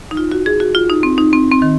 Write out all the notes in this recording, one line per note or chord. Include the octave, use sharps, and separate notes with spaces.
D#4
F4
F#4
G#4
F#4
F4
D#4
C4
D#4
C4
C4
D#3